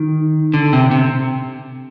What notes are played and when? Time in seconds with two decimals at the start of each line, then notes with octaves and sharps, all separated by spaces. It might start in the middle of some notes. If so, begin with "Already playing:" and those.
Already playing: D#3
0.54 D3
0.73 C3
0.91 C3